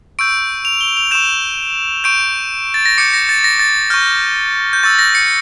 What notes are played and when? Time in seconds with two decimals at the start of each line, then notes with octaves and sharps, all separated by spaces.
0.19 C#6 E6 G6 D7
0.65 F7
0.81 G7
0.97 F7
1.11 C#6 E6 G6 E7
2.04 C#6 G6 D7
2.74 A6
2.86 A#6
2.98 D6 G6 C#7
3.14 A#6
3.29 A6
3.44 A#6
3.59 A6
3.90 C#6 F6 G6
4.73 G6
4.83 C#6 E6 G6 A6
4.99 A#6
5.15 C#7